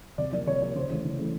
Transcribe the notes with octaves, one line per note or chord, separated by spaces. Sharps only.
C3 D5
F3 A#3 D5
C3 C#5
F3 A#3 C#5
C#3 C5
E3 A3
C#3
E3 A3